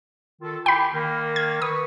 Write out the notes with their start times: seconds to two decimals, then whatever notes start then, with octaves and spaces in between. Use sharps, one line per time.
0.42 D#3 F4 A4
0.66 E4 G4 G5 B5
0.94 D#3 A#3
1.36 G#6
1.62 B4 B5 C#6 D#6